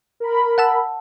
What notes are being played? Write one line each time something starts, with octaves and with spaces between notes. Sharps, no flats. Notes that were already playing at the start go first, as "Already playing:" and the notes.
A#4 B5
F#5 A5 E6